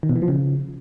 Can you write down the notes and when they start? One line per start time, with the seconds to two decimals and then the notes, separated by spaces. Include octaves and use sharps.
0.03 D#3
0.09 B2
0.16 E3
0.22 F3
0.28 C#3